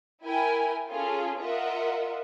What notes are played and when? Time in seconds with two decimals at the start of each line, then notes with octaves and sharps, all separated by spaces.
0.24 E4 A#4 G5 G#5
0.89 C#4 F4 G#4 A4
1.39 F4 A#4 D#5 E5 F#5